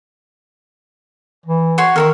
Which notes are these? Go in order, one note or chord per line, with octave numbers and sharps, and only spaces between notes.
E3
F#4 C#5 C6
D#3 E4 A4 A#4